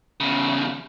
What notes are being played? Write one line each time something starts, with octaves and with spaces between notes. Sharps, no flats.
E2 C#3